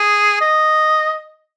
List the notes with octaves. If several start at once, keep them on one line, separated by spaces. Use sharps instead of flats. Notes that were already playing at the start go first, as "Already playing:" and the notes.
Already playing: G#4
D#5